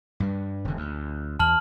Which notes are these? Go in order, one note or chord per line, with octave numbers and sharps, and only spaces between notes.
G2 G3
E1 D3
D2
E2 A5 F6 F#7